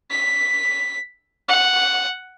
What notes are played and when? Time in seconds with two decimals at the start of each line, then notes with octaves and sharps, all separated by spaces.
0.11 B6
1.49 F#5